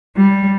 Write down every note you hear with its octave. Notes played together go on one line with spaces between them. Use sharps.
G3